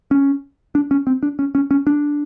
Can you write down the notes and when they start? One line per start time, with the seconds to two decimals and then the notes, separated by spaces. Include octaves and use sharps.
0.11 C#4
0.75 D4
0.91 C#4
1.07 C4
1.23 D4
1.39 C#4
1.55 C#4
1.71 C#4
1.87 D4